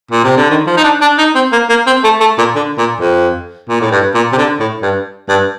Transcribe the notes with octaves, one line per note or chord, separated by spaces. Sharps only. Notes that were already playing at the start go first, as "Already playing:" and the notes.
A#2
C3
D3
D#3
F3
D#4
D4
D4
D#4
C4
A#3
A#3
C4
A3
A3
A#2
D3
A#2
F2
A#2
A2
G2
A#2
C3
D3
A2
G2
G2